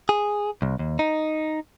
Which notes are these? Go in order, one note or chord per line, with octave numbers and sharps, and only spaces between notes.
G#4
C2
D#2
D#4